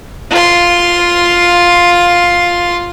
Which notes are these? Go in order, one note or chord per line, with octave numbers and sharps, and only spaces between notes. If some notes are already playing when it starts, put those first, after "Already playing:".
F4 C6